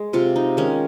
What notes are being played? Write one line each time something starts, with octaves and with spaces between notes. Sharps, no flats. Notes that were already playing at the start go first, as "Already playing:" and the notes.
Already playing: G#3
C3 F4
D#4
D#3 G#3 C#4